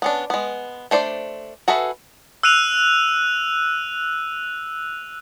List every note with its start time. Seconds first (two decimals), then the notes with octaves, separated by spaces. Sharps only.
0.02 B3 C#4 D4
0.30 G#3 B3
0.91 A3 D4 C5 D5
1.68 F#4 G#4 A4 B4 E5
2.43 E6 F#6 D#7 F7